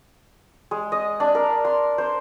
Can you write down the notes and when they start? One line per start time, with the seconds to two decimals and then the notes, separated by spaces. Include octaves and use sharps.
0.71 G#3
0.92 D#5
1.20 D4
1.35 A#4
1.65 C6
1.98 C5